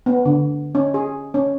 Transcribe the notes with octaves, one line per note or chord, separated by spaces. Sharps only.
B3
D3
C#4
G#4
C#4